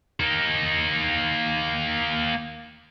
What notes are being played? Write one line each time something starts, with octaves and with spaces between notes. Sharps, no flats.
A#3 D#4